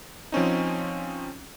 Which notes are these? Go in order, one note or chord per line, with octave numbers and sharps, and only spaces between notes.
F3 C4 C#4 D#4